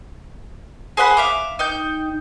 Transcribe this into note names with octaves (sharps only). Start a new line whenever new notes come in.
G#4 C5 F#5 B5
E5 F5 D6
D#4 G5 G6